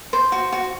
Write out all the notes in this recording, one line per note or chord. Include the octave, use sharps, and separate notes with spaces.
C5
F#4
F#4